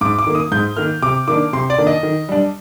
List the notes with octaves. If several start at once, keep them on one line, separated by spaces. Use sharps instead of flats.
G#2 D6
D6
D#3 A#3
D#6
G#2 G6
D#3 A#3 F6
C3 D6
D#3 A#3 D4 D6
C3 C6
D5
D#3 A#3 D4
D#5
D#3
G3 D4